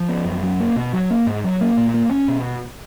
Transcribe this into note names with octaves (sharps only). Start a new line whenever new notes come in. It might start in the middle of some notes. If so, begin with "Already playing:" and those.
Already playing: F3
B3
F#2
F#3
A#3
B2
F#3
A#3
G#2
F#3
A#3
A#2
A#3
C#4
B2